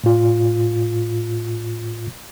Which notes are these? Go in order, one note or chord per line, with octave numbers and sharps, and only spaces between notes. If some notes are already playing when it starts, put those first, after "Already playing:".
A2 F4